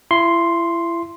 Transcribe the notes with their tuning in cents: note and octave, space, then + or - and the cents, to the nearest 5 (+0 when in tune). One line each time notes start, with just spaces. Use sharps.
E4 +35 C6 +0